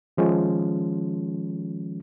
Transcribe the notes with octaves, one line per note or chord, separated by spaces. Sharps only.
D#3 F3 G#3 C#4